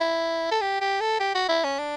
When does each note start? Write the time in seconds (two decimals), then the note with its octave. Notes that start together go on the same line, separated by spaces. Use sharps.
0.01 E4
0.51 A4
0.61 G4
0.81 G4
1.01 A4
1.20 G4
1.35 F#4
1.49 E4
1.64 C#4
1.79 D4